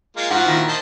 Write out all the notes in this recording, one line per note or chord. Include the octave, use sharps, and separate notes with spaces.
G#3 A#3 F4
G#2 F3 F#4 F#5
A#2 D#3 E4
D#3 C5 A5